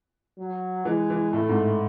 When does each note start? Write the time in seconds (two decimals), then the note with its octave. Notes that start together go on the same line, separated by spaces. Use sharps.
0.38 F#3
0.85 E3 G#3
1.10 E3
1.33 A2 A3
1.49 G#2